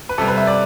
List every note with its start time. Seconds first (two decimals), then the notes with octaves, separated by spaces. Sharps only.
0.09 B4
0.18 C3 G3 A4
0.28 B4
0.38 E5
0.47 D5